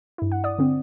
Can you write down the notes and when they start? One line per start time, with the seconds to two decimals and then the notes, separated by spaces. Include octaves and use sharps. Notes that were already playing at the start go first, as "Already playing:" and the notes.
0.18 G2 E4
0.32 F#5
0.44 D5 D#6
0.58 D3 C4